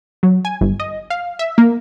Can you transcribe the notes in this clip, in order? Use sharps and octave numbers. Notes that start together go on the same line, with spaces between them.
F#3
G#5
G1
D#5
F5
E5
A#3